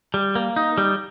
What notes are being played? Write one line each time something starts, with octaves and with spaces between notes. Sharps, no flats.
G3
A#3
D#4
G3